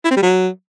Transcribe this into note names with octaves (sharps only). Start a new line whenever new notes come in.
E4
C4
G3
F#3